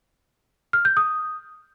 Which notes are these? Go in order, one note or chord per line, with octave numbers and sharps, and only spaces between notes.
F6
G6
D#6